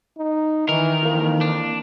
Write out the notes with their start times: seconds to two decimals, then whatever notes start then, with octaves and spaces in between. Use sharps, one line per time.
0.18 D#4
0.69 D#3 E3 A#4
1.03 F2 E3 A#3
1.41 D4